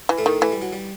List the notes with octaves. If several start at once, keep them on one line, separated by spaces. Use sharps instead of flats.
E3
A2 A3
D#3
E3 A3
G3
F#3
G3